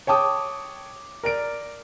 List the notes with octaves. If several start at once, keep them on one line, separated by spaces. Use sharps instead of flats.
C#5 G5 A5 D6 D#6
A#4 D5 D7